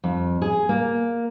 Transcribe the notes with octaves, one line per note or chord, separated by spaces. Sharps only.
F2
G#4
A#3